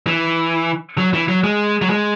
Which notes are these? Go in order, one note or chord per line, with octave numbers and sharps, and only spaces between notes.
E3
F#3
E3
F#3
G#3
F#3
G#3